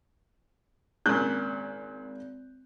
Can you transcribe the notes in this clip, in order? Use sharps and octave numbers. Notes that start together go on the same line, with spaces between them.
G#1 A#2 C#3 F#6 G6